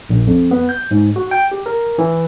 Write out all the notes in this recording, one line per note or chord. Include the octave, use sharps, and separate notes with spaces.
A#1
F2
B3
G6
G#2
F#4
G5
G4
A#4
E3